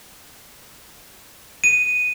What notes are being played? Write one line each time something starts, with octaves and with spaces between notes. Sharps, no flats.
D#7